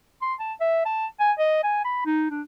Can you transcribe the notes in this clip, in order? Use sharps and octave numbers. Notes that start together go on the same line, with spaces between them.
C6
A5
E5
A5
G#5
D#5
G#5
B5
D#4
D4